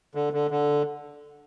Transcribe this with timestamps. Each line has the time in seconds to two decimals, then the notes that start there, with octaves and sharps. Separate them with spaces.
0.15 D3
0.33 D3
0.51 D3